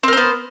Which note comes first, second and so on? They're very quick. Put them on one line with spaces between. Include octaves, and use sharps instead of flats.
C4 A#4 C5 B3